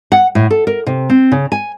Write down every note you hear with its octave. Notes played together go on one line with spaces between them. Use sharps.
F#5
A2
A4
A#4
C3
C4
C#3
G#5